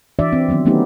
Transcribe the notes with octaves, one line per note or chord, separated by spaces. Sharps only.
E3 D4 F#4 D5 E5
C4
D#3 F#3 B3 D4
F#3 A3 B3 C#4 D#4 G4